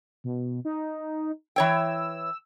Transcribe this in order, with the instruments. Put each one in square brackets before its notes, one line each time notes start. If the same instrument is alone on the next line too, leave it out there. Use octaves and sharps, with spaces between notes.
[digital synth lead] B2
D#4
[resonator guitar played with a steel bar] E3 C#5 G5 [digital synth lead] E6